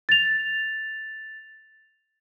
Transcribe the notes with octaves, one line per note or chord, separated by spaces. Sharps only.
A6 F7